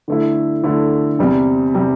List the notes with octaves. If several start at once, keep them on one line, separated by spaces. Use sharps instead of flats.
D3 A3 E4
D3 A3 E4
E2 C3 G3
C3 G3